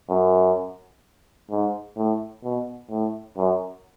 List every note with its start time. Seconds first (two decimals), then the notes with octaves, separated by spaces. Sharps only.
0.09 F#2
1.50 G#2
1.97 A2
2.44 B2
2.90 A2
3.37 F#2